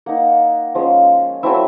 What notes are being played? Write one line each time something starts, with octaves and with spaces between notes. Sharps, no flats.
A#3 D#4 F#5
F3 G#3 C#4
F#3 A3 C4 E4 E5